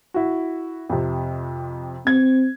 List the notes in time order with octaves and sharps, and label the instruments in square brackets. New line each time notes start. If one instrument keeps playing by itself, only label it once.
[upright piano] E4 F#4
F2 C3
[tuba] C4 [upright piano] G#6